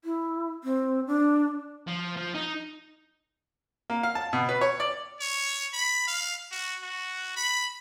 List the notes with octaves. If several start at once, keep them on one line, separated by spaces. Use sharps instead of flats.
E4
C4
D4
F3
F3
D#4
A#3
F5
A5
B2
B4
C#5
D5
C#5
B5
F5
F#4
F#4
B5